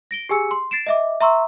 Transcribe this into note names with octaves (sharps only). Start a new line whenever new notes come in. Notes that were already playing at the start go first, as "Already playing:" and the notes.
A#6 D7 G7
G4 G#4 G#5 E6 C#7
C6
A6 C7 D7 E7
D#5 E5 D6
E5 A#5 C6 C#6 E6